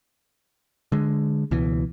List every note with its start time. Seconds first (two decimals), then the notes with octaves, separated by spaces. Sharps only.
0.92 D3 G#3
1.51 C#2 B2 E3